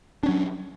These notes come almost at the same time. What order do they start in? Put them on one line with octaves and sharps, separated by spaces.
D4 C#4 F#3